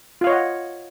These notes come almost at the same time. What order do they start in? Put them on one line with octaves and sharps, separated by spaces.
F4 F5 C#5 D#5 F#5